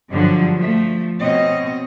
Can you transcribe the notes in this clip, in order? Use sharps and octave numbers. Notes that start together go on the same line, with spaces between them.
G2 D3 F3 F#3
F3 A3
B2 C4 C#5 D#5